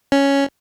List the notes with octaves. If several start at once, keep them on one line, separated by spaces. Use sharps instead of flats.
C#4